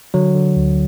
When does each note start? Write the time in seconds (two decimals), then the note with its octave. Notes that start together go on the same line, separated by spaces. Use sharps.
0.14 D3 F#3
0.35 D3
0.56 D2